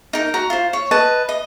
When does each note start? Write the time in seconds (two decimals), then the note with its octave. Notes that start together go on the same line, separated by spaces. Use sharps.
0.13 D#4 A#4
0.34 F#4 A#5
0.50 F4 C5
0.73 C#5
0.91 B4 D#5 A5
1.29 D#5